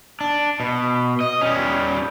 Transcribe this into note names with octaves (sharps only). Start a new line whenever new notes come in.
D4
B2
D#5
G3 C#4